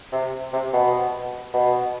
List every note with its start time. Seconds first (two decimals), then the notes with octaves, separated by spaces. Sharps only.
0.12 C3
0.53 C3
0.73 B2
1.54 B2